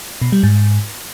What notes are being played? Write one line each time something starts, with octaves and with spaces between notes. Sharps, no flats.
B2
G3
G#2